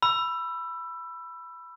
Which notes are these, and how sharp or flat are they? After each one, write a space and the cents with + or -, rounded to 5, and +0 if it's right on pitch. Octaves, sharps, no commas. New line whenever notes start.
B5 +0 E6 +20